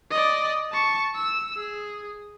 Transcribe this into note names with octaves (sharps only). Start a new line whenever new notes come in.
D5 D#5
A5 C#6
E6
G#4